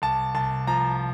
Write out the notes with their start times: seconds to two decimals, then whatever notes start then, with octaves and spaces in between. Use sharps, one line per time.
0.02 C2 A5
0.35 C2 A5
0.67 F3 A#5